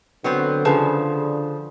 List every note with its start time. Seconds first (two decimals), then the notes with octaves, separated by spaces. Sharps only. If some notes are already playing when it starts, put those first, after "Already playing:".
0.24 D3 F#3 B3 C4
0.65 C#3 F3 G#4 B4 A5